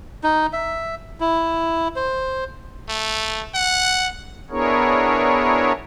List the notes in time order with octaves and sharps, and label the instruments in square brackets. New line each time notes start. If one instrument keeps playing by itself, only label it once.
[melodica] D#4
E5
E4
C5
[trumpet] A3
F#5
[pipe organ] B3 D4 E4 G#4 A#4 C#5